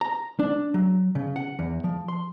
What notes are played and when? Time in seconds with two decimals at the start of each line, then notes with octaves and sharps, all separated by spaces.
0.01 A#5
0.39 D4
0.74 F#3
1.15 C#3
1.36 F#5
1.59 E2
1.84 F3
2.08 C6